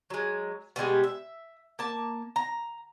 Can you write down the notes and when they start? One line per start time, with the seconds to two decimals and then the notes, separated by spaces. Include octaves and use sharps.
0.10 F#3 G#3
0.76 B2 G3 G#3 G4
1.04 E5
1.79 A#3 A5
2.36 A#5